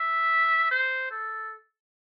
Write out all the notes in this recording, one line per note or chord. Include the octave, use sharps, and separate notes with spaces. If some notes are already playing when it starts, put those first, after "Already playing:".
Already playing: E5
C5
A4